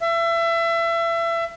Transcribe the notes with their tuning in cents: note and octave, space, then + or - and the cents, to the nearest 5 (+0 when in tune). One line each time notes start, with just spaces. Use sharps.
E5 +30